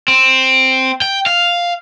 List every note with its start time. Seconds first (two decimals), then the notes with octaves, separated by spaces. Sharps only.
0.08 C4
1.02 G5
1.26 F5